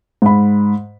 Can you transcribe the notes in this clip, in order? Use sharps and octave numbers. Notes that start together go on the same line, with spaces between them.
G#2 B5